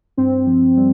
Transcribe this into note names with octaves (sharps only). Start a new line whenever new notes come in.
G2 C4
F3
G3